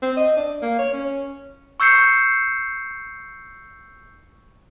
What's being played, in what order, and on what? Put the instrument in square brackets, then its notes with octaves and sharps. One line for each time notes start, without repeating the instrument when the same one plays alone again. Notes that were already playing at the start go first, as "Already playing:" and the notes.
[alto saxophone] C4
D#5
D4
A#3
C#5
C#4
[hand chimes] C#6 E6 G6 C7 C#7